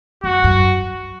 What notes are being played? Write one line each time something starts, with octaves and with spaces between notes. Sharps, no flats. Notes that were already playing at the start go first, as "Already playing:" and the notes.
F#2 F#4
F#2